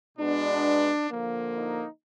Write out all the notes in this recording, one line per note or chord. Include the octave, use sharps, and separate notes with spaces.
B2 G#3 B3 D4
D3 F3 A#3
D#4